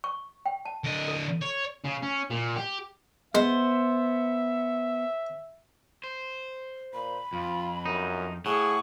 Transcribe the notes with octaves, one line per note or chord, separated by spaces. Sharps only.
C#6
G5
A5
D3 D#5
A4
C#5
C#3
C#4
A#2
G4
G#3 B3 C5 E5
C5
A#2 B5
F2 F4
F#2 D#4
A2 G#4 F#5 C#6